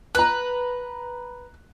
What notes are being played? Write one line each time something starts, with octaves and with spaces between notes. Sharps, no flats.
B4 A#5 F#6